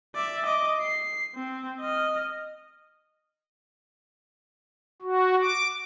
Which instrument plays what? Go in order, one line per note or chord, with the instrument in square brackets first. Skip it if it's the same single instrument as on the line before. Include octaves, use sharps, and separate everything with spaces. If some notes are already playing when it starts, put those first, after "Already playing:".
[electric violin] D5 E5
D#5 D6
C7
C4
D#5 F6
[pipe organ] F#4
D6